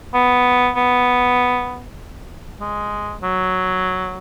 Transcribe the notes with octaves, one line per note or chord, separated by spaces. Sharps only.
B3
B3
G#3
F#3